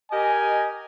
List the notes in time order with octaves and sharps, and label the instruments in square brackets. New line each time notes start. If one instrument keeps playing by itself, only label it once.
[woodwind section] G4 A#4 D#5 [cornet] G#5